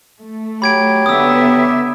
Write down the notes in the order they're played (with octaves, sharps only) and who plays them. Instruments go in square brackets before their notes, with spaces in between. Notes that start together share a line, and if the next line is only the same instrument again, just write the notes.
[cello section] A3
[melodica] F#3 G4 [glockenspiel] B5 G#6 D7
[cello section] D3 B3 E5 [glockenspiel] D#6 E6